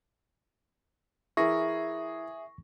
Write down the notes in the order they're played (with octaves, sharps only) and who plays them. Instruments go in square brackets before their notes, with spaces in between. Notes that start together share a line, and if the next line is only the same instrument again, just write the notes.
[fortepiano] E3 A#4 [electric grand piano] G#4 [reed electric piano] E5 [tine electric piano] C#6 A#6